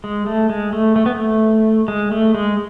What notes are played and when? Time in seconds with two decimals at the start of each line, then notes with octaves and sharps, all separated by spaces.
0.04 G#3
0.26 A3
0.49 G#3
0.73 A3
0.96 A3
1.06 B3
1.15 A3
1.88 G#3
2.11 A3
2.35 G#3